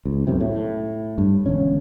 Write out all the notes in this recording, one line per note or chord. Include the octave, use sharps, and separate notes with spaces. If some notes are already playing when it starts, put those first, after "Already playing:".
C#2
B1 F#2 C3
A2
G2
E1 D3 C#4